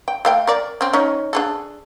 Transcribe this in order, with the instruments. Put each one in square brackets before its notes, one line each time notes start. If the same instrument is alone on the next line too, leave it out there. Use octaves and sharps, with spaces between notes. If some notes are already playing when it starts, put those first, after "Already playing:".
[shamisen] G5
A3 F5 G5
A#4 D5
C4 C#4
C#4 D#4 C#5
D4 G#4 A4